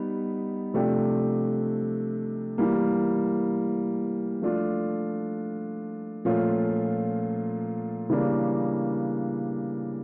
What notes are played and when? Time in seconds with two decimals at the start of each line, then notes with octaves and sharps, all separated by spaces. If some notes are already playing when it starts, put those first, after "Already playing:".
Already playing: G3 B3 D#4
0.74 C3 F3 A3 D4 G4
2.58 E3 G3 A#3
4.42 F3 A3 D4 F4
6.25 A#2 F3 A3 C#4 F4
8.10 C#3 E3 G3 A#3 D4